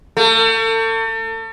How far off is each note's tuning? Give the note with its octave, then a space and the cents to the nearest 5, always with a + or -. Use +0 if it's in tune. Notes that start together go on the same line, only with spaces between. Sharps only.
A3 +40